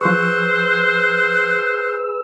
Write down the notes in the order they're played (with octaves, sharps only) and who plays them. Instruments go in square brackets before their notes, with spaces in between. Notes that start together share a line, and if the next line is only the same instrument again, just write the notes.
[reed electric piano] F3 C6 C#6 [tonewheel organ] G#4 B4 E6 [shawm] C5 [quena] F#6